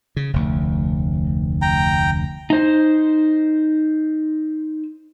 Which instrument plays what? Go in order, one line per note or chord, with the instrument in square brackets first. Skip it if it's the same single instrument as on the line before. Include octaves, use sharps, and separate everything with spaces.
[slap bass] C#3
F1 D2
[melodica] G5 A#5
[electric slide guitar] D#4 C5